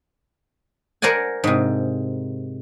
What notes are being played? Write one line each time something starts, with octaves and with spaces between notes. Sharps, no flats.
A#4 C5 D5 F#5 G#5
G#2 C3